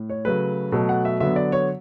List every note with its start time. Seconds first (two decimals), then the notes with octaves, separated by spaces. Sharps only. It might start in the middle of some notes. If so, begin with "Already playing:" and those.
Already playing: A2
0.10 C#5
0.25 C#3 F#3 A3 B4
0.72 B2 F#3 A3 A4
0.89 F#5
1.05 E5
1.20 D3 F#3 B3 E5
1.36 D5
1.52 C#5